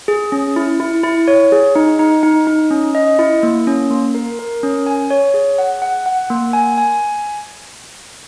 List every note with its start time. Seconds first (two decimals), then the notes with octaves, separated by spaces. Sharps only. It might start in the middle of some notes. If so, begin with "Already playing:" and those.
0.08 G#4
0.32 C#4
0.56 E4
0.80 E4
1.04 E4
1.28 C#5
1.52 G#4
1.76 D#4
1.99 D#4
2.23 D#4
2.47 D#4
2.71 C#4
2.95 D#5
3.19 E4
3.43 A#3
3.67 C#4
3.91 A#3
4.15 A#4
4.39 A#4
4.63 C#4
4.86 G#5
5.10 C#5
5.34 G#4
5.58 F#5
5.82 F#5
6.06 F#5
6.30 A#3
6.53 G#5
6.78 G#5